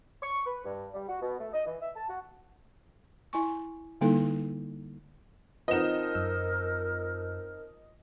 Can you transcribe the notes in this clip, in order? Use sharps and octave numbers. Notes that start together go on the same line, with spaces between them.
C#6
B4
G2
G3
F#4
B2
A3
D#5
E3
E5
A5
F#4
E4 G#5 C#6
D3 G3 A#3 D#4 E4 A4
F3 C4 D#4 A#4 B4 D#5 F#5 E7
F#2 E6